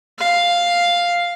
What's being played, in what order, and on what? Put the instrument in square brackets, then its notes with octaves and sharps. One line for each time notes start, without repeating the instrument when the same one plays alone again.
[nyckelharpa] F5